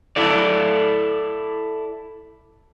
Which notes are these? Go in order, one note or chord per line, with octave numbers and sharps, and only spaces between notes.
E4 A4 D5